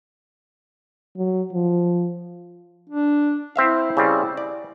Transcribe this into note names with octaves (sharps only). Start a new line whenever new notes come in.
F#3
F3
D4
C4 E4 E5 F5
C#3 G3 C4
D5